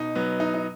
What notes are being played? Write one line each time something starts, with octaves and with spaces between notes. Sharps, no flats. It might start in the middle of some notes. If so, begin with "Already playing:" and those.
Already playing: B2 D#4
F#3 B3
D#4
D#4